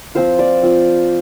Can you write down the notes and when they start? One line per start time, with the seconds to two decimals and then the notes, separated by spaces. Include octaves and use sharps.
0.15 F3 C4 F4 C5
0.39 D5
0.63 F3 C4 F4